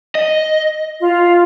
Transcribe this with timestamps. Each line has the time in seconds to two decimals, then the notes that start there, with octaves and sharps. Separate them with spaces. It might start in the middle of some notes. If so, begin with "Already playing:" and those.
0.15 D#5
1.00 F4